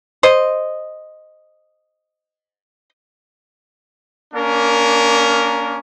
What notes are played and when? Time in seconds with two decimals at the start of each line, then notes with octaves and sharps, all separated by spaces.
0.23 C5 D#5
4.34 A#3 C#4 D4 A#4